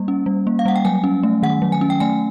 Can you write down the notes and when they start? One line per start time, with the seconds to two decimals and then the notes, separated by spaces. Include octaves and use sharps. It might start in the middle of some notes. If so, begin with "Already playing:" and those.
Already playing: G3 A#3
0.08 C#4
0.26 G3
0.47 A#3
0.59 F5
0.66 G3 F#5
0.76 G5
0.85 F#3 G#5
1.04 C#4
1.23 A3
1.43 D#3 F#5
1.62 F#3
1.72 G#5
1.81 C#4
1.90 G5
2.00 A3 G#5